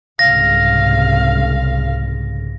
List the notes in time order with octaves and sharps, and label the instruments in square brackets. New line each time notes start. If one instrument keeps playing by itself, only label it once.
[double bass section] C2 G#2 C#3 [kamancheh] F5 [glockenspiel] A#6